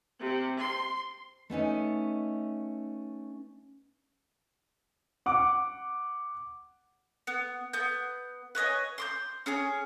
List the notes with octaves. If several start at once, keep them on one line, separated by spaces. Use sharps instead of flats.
C3
C6
A3 B3 C#4 D#4
F#5 D6
B3
B3 G6
B4 C#5 D#5 G#5
C6 D6 G6
C#4 G#4 G#5